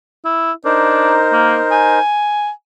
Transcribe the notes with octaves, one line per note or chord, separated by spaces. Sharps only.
E4
D4 D#4 A#4 C5
A#3
G#5